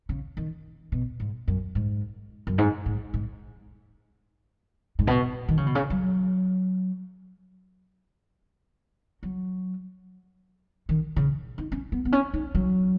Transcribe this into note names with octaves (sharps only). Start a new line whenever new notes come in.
C#3
D#3
B2
G#2
F#2
G#2
F#2
G#2
G#2
G#2
G#2
B2
D#3
C#3
B2
C#3
F#3
F#3
D#3
C#3
D#4
C#4
B3
B3
C#4
D#4
F#3